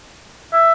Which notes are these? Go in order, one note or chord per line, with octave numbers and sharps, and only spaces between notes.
E5